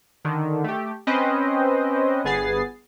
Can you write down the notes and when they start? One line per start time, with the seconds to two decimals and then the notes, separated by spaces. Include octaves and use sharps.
0.24 D3 D#3
0.64 A3 G4
1.07 C4 C#4 B4 C5 D#5 G5
2.24 G1 B3 G#4 A6 C7